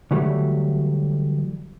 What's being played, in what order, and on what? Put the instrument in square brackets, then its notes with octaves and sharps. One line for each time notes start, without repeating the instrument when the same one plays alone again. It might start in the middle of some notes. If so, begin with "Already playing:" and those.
[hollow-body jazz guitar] D3 E3 F#3 G3 A3